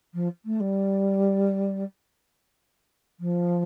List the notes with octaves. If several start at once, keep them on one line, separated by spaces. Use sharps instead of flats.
F3
A3
G3
F3